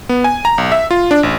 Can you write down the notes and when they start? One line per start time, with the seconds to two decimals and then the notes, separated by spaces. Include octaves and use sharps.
0.09 B3
0.24 G#5
0.45 A#5
0.58 B1
0.72 E5
0.91 F4
1.11 D4
1.23 A1